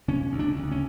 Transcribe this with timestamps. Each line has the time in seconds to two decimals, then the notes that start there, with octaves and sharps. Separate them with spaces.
0.08 C#3 C#4
0.32 D2
0.39 D4
0.56 D2
0.71 C#4